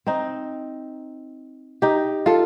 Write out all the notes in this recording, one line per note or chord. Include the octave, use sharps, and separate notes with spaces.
C4 D#4
D#4 G4
F4 A4